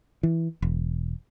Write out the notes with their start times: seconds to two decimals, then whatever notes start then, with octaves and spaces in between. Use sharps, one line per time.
0.23 E3
0.62 E1